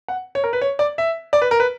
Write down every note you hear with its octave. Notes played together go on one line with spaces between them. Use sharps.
F#5
C#5
A#4
B4
C#5
D5
E5
D5
B4
A#4
B4